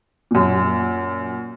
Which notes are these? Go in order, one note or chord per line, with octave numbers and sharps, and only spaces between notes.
F#2 A#2